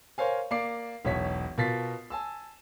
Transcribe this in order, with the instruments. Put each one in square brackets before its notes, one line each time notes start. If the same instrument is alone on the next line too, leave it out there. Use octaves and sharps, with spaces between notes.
[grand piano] A#4 C5 C#5 F5 G#5
A#3 D5 D6 C7
E1 B1 C#5 B6
B2 F4 A#4 A6 B6 C7
G#5 A5 E6